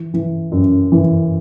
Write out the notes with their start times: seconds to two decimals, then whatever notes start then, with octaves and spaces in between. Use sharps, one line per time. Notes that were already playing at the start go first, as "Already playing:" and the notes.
Already playing: E3
0.14 E3
0.52 F#2
0.92 E3